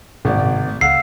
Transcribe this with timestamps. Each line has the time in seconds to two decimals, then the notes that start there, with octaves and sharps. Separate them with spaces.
0.25 G#1 B2 A3 C#4 D5
0.37 A2 C3
0.68 A3
0.81 C#2 F5 F#5 E6 C7